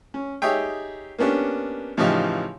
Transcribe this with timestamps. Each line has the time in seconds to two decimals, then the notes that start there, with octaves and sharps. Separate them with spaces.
0.14 C#4
0.42 D#4 G4 G#4 C#5 E5 G5
1.19 A#3 B3 C#4 D4 G4
1.97 A2 C#3 E3 F3 D#4 G4